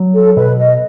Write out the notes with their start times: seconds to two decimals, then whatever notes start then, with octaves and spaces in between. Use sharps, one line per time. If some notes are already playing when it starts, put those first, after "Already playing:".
Already playing: F#3
0.15 A4
0.36 B2 B4
0.58 D#5